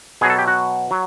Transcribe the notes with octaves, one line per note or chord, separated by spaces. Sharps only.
B2 F#3 G#4
A4
G4
F#4
F#3